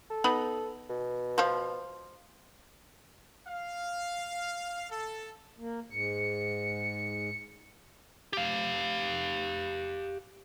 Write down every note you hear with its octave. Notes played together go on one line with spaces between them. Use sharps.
A4
B3 D#4 B5
B2
F3 C5
F5
A4
A#3
G#2 C#7
G4 F5